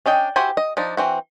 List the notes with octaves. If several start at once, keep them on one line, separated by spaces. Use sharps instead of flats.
C#4 D4 D#5 G5
E4 F#4 G4 C5 G#5
D#5
F3 D4 D#4
E3 C4 F#4